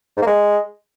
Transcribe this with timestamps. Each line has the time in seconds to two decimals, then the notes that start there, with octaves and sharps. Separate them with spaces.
0.17 G#2
0.22 A#3
0.27 G#3